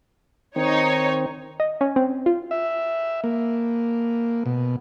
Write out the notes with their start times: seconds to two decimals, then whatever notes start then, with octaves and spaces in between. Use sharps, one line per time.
0.56 D#3 C4 D#4 C#5
1.60 D#5
1.81 C#4
1.96 C4
2.26 F4
2.51 E5
3.24 A#3
4.46 B2